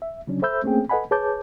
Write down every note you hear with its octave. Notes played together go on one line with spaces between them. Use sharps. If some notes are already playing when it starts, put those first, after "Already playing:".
E5
C#3 F#3 C#4 D4
A4 C5 E5 B5 E6 G6
A3 A#3 C4 C#4 G#4 G5
A4 B4 D#5 F#5 G#5 B5
G#4 B4 C#5 A5 D6 G6